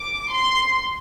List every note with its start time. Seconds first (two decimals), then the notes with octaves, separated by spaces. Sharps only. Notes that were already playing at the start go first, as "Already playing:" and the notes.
Already playing: D6
0.31 C6